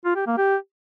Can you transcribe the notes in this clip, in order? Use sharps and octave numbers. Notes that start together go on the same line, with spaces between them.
F4
G4
A#3
G4